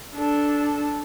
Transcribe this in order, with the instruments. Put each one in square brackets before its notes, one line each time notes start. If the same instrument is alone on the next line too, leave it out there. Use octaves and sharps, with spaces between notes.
[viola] D4 A4